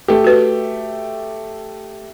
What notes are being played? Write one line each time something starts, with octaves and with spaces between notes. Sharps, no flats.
A3 G4
F#4 B4